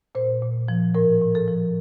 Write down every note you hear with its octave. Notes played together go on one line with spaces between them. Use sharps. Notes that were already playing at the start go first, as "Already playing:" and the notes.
A#2 C5
A#2
F3
A2 A#4
A2
A4
F3